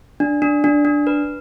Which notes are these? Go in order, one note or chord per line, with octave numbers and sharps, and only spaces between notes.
D4
D4
D4
D4
B4